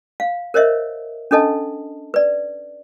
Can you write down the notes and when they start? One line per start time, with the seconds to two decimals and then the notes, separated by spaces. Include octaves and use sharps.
0.20 F5
0.54 A#4 C5 C#5 D#5 E5
1.31 C#4 D4 A4 D#5 A5
2.14 B4 D5